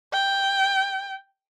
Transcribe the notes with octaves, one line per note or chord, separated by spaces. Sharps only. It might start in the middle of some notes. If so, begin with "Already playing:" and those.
G5